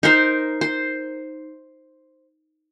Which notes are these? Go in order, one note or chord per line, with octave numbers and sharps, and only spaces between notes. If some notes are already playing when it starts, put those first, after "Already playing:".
D#4 A#4 C5
C5